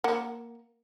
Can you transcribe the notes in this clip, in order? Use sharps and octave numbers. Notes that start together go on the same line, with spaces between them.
A#3 F#5